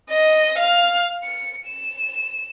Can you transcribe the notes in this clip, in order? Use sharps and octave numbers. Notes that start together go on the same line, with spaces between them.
D#5
F5 F6
C#7
E7